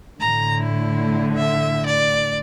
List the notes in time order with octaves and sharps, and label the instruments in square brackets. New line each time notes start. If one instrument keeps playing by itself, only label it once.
[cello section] A2 D3 [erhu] A#5
[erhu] E4
E5
D5